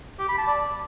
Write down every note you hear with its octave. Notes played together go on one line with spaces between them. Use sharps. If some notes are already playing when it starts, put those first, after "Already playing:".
G4
B5
A5
D5